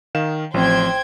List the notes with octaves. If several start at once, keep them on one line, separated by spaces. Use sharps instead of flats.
D#3 F5 E7
A1 F3 C4 C5 G5 G#6